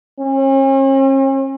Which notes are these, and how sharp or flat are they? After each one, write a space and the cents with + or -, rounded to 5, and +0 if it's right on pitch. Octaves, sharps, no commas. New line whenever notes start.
C#4 -45